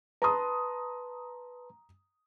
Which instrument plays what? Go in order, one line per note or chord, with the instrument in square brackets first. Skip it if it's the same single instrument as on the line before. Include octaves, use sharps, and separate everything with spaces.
[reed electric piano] B4 A5 C6 [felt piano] A#5 D#6